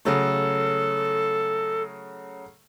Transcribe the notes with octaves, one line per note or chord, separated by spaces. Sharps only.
C#3 F#3 A3 A4